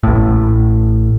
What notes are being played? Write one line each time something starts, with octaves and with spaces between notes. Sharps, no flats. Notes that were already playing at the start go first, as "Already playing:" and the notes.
A1 A2